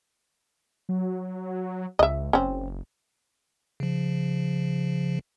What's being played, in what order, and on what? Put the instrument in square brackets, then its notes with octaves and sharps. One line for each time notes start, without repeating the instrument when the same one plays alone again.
[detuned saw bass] F#3
[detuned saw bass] C#2 [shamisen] D#5 E5
[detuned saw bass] F#1 [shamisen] C4 C#4
[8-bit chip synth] C#3 F3